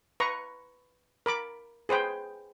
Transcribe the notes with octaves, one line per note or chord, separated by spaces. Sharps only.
B4 A#5 C#6
A#4 B5 D6
G#4 B4 C5 G5